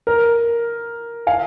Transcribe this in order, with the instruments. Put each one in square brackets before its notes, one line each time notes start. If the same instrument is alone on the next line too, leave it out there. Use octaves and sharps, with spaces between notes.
[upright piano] A#4
F5 G#5